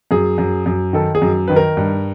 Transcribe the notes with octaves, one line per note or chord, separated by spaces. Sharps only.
F#2 G#4
F#2
F#2
D#3 A4
G#4
F#2
D#3 B4
A#4
G2